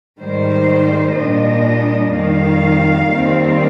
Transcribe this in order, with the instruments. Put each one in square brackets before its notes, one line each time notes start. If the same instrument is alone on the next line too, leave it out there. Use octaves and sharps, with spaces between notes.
[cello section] G#2 D#3 G3 C5
A#2 G3 D4 D#5
F2 D#3 G3 F5
D#2 D#3 G3 C4